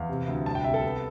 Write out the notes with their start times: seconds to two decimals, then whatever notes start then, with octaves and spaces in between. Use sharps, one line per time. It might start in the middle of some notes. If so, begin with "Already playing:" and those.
Already playing: E2 F5
0.09 C3
0.28 D2
0.46 C2 A5
0.55 G5
0.64 C3 E5
0.74 A4
0.84 B3